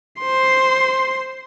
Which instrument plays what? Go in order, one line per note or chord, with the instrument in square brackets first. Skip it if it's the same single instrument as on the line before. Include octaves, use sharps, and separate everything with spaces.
[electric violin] C5 C6